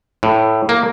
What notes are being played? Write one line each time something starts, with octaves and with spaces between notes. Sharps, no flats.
A2
A#3